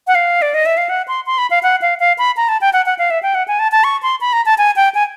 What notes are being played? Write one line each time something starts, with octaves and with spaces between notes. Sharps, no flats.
F#5
F5
D5
D#5
E5
F5
F#5
C6
C6
B5
F5
F#5
F5
F5
B5
A#5
A5
G5
F#5
F#5
F5
E5
G5
F#5
G#5
A5
A5
C#6
C6
B5
A#5
A5
G#5
G5
G#5